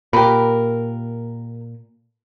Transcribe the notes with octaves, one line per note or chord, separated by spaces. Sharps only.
A#2 G4 A#4 B4